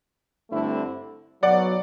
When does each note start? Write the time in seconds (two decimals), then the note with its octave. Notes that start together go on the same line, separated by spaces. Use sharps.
0.50 G2 D3 A3 C4 E4
1.43 B1 B2 F#3 D5 F#5